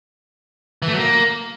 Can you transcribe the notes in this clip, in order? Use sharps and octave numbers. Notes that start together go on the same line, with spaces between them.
E3
A3
F#3
A#3